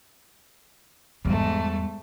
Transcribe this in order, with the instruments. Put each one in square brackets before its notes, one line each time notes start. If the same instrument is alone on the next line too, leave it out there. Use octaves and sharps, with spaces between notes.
[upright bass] E2 G3 [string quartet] G#2 A3